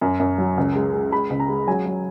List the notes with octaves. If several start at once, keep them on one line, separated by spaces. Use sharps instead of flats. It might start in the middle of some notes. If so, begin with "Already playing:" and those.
F#2
F#2
F#3
C#2
G#3
G#3
G#3 B5
C#2
A#5
G#3
F#3 G#5
F#3